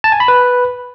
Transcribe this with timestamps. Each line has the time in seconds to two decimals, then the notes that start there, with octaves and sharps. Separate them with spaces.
0.04 A5
0.12 G#5
0.20 B5
0.28 B4